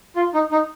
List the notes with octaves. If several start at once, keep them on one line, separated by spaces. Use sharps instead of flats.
F4
D#4
D#4